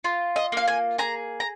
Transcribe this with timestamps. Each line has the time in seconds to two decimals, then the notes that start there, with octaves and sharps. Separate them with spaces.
0.04 F4
0.36 D#5
0.52 A#3 F5
0.68 G#5
0.98 G#4 A#5
1.40 A#5